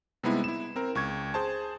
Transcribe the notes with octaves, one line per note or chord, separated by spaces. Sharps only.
C3 G3 G#3 B3 D#4 E4
E4 E7
C4 A#4
C#2 C#6 G#6
G#4 C5 A5